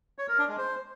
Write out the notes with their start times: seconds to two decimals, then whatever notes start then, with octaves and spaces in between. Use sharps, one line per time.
0.18 C#5
0.28 A#4
0.38 D4
0.48 G#3
0.58 C5